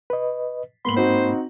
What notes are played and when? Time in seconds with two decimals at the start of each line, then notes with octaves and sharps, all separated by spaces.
0.10 B4 D#5
0.85 G#2 A#3 B3 B5 C6 F#7
0.96 C4 D#4 F#4 C5